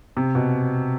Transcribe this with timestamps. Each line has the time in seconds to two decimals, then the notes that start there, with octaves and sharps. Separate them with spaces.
0.17 C3
0.35 B2